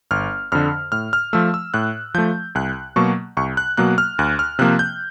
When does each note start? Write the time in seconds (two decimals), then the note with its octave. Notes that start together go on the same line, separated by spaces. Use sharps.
0.11 G1 F6
0.52 F2 D3 F6
0.92 A2 F6
1.13 F6
1.33 F3 A3 E6
1.54 E6
1.74 A2 F#6
2.14 F3 A3 G6
2.55 C2 F#6
2.96 B2 F#3 A#3 C#6
3.37 C2 C#6
3.57 F#6
3.77 B2 F#3 A#3 F#6
3.98 F6
4.19 D2 F#6
4.39 F6
4.59 C3 F3 A#3 F#6
4.79 G6